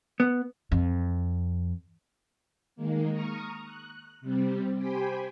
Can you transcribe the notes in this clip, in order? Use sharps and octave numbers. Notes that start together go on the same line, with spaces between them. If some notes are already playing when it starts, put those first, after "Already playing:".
B3
F2
D#3 G#3 A#3
A#5 C#6 D#6 F6
F#6
C3 G3 C4
G4 C5 G5 G#5 B5